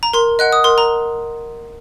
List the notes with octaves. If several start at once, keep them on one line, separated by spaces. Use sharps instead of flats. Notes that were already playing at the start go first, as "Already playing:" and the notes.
A#5
A#4 C6
D#5 F#5 F#6
D#6
A#4 C6
A#5